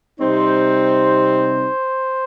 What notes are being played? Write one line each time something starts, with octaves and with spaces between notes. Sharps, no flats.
C3 G3 C4 D#4 C5